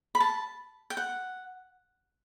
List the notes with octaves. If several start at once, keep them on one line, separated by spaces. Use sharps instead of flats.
B5
A5
G5
F#5